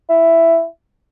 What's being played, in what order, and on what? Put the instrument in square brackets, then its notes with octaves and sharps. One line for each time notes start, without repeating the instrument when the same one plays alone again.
[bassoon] E4